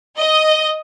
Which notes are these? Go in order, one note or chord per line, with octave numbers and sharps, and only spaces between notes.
D#5